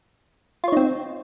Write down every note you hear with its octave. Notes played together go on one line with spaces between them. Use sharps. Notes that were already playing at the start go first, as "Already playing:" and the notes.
C4 D#4 F4 C#5